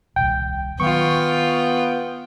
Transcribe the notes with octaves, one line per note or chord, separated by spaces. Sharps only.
D#1 C2 G5
D#3 F#3 B3 F4 G5 C#6